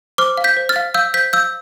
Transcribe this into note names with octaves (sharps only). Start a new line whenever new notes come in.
C5 D6 F6
F5
G6 B6
C5
F6 A6
F5
F5 E6 G6
C5 G6 B6
F5 E6 G6